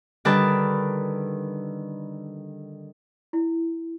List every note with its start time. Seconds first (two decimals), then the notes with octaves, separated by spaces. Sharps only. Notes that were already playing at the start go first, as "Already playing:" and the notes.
0.25 D3 D#3 G3 B4 A5
3.33 E4